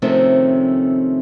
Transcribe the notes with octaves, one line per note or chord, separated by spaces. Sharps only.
C3 D#3 F3 A3 C4 C#4